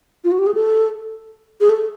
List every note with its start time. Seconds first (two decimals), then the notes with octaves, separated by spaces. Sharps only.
0.24 F4
0.32 F#4
0.39 G4
0.47 G#4
0.54 A4
1.61 G#4
1.69 A4